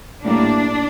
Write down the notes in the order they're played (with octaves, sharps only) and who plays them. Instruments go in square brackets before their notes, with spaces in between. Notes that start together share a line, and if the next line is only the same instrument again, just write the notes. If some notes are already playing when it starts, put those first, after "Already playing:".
[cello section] A2 G3 A#3 D4